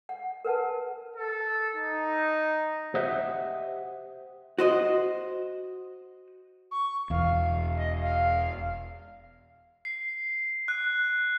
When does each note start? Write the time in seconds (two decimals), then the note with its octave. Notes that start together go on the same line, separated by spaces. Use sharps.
0.09 F#5
0.45 A#4 B4 F#5 A5
1.16 A4
1.76 D#4
2.94 G4 C5 D#5 E5 F#5
4.58 F#4 C5 D#5
6.71 C#6
7.10 E1 E2 F5
7.76 D#5
8.02 F5
9.85 C7
10.68 F#6